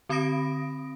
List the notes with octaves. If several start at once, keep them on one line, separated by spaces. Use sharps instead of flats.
D3 C4 B5 D#6 A#6 D7